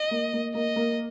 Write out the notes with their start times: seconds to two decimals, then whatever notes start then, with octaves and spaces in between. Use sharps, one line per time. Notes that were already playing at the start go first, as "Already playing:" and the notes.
Already playing: D#5
0.11 A#3
0.33 A#3
0.54 A#3 D#5
0.76 A#3